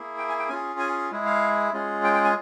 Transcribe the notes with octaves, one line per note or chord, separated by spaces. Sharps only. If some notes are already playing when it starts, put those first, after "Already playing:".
Already playing: A#3 E4 G#4
G5
G#5
G5
C#4 F4 G#4 G#5
G#5
G#3 E4 G#4
F5
G#3 C#4 F4 G#4
G5
G5
G#5